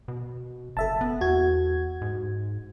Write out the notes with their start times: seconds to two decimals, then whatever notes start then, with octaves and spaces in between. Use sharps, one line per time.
0.08 B2
0.77 F#1 A4 E5 A5
1.01 B3
1.21 E2 F#4 G#6
2.02 G#2